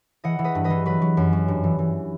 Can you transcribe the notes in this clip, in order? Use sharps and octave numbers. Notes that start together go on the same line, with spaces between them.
E3 D#5 F#5
E3
B4 D#5
G2
B4 D#5
E3
F#3 B4
F#3
F#2
F#3
G2
E3
E3